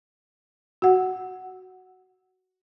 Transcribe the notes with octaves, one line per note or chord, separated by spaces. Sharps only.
F#4 F#5